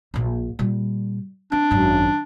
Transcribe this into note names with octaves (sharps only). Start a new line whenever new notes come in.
A#1 A#2
A#2 G3
C4 D4
G#1 F#2